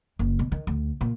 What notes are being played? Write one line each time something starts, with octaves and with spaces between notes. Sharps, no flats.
F#1
B2
D#3
D2
A#2